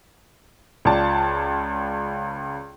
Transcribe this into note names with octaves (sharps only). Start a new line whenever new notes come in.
C#2 F4 D5 A5